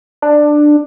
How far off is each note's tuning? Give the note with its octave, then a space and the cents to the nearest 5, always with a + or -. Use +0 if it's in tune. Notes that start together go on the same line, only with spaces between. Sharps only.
D4 +15